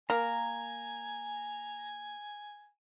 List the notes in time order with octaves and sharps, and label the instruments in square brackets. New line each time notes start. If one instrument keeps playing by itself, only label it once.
[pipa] A#3 [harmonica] G#5 [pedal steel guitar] A#5